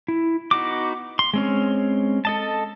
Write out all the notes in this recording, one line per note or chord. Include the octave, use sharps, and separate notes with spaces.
E4
B3 D#4 F#4 D6
C6
G#3 C4 C#4
A4 D#5 A5